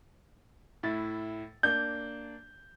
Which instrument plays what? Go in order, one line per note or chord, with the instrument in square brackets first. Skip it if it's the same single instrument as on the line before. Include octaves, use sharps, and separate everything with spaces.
[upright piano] A2 E4 A6
[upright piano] A#3 D4 [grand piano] G6